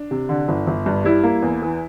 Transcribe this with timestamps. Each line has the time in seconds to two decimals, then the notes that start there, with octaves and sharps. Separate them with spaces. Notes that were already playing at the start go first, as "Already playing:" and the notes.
Already playing: D4
0.11 C3
0.29 D3
0.48 G1
0.67 G1
0.86 G2
1.05 G3 E4
1.23 A#3
1.42 E2
1.62 E3